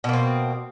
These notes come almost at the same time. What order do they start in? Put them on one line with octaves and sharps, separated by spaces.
B2 A#3 C4